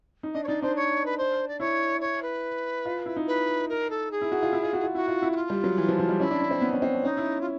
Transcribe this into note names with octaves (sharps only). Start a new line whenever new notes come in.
D#4
D4 D#5
C#5
D#4 D5
D4 C5
C#5
B4
C5
D5
E4 C#5
C#5
B4
F4
E4
D#4
B4
A#4
A4
G#4
E4
F#4
F4
E4
F4
F#4
F4
E4 F#4
F4
E4
F#4
F4
G3
F#3
E3
F3
F3
G3
C#4 E4
D4
D4
C4
B3
C#4
C4
C#4
C#4 D#4
E4
F4